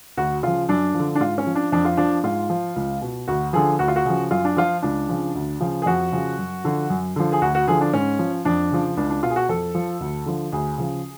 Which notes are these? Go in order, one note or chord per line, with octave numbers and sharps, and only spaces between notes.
D2 F#4
C#3 F3 F4
F#2 D4
D3 F3
D4
G#2 F4
C#4
F3
D4
F2 D4
F4
F3 D4
G#2 F4
F3
C#2
B2
D2 F#4
D3 F3 G#4
D2 F#4
F4
F#4
C#3 F3
F#2 F4
D4
F3 F4
C#2 D4
C#3 F3
D2
C#3 F3
G#4
F2 F#4
C#3 F3
F#2
D3 F3
F#2
D3 F3
G#4
D2 F#4
F#4
D3 F3 G#4
D4
G#2 C#4
F3
F2 D4
C#3 F3
C#2 D4
D4
B2 F4
G#4
F#4
F2 A4
F3
D2
D3 F3
D2 G#4
C#3 F3